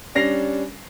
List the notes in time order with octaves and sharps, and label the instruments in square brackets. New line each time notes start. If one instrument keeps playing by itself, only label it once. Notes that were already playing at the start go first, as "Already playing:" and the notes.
[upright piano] G3 C#4 D4 A#6 C7 F7